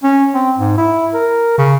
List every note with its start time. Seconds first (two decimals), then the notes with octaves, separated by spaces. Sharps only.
0.03 C#4
0.34 C4
0.58 G#2
0.77 E4
1.14 A#4
1.58 C#3